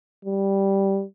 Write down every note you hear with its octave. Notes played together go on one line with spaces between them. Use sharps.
G3